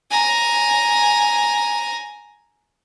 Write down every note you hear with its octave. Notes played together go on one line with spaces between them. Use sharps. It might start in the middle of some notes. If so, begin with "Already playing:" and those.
G#5 A#5